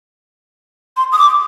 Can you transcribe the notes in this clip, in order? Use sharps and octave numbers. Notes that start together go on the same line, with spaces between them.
C6
D#6
D6